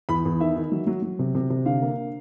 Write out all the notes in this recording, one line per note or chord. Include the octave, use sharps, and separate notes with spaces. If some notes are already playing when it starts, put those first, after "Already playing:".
E2 B5
E2
D#3 E5
D#3
F#3
F#3
F#3
C3
C3
C3
D3 F5
A#3